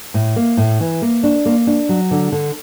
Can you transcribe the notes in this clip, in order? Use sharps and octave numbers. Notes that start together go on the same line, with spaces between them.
A2
A#3
A2
E3
A#3
D4
A#3
D4
F#3
D3
D3